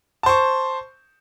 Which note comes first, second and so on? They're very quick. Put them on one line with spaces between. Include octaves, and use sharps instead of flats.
A5 C5 C#6